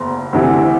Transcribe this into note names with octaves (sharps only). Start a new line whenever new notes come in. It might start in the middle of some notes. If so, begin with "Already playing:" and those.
Already playing: F#1 E2 A#5 C6
D2 C3 E3